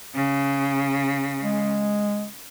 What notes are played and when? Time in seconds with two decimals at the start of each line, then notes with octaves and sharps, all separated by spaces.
0.14 C#3
1.42 G#3